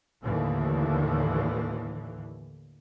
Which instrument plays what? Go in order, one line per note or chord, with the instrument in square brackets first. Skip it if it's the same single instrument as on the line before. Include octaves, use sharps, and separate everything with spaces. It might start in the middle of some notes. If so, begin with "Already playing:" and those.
[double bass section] D#2 A2 D3 E3